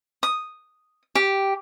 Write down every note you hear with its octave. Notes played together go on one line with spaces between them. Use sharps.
D#6
G4